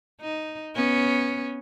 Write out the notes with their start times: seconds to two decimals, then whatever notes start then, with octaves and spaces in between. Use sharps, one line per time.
0.21 D#4
0.75 B3 C#4